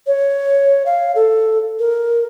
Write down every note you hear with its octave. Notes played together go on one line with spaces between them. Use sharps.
C#5
F5
A4
A#4